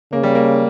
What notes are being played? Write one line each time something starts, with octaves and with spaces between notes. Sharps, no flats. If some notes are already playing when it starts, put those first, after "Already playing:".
C#3 A#3
G3
A#3